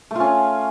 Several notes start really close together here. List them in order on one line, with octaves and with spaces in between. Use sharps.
A3 F4 C#4